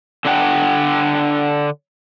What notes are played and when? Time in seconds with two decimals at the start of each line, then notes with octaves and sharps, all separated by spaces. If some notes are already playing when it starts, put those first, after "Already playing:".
0.25 D3 D4 F#5 G5